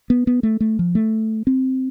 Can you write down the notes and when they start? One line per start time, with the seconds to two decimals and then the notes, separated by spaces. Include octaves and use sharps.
0.10 B3
0.27 B3
0.43 A3
0.60 A3
0.79 F3
0.95 A3
1.47 C4